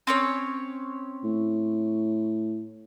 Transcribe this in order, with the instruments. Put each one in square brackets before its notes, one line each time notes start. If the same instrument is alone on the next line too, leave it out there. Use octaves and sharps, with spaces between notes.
[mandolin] C4 C#4 C#5
[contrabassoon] A2